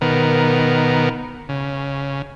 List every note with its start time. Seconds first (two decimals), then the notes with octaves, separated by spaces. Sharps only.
0.01 B2 D#3 B3 A#4
1.49 C#3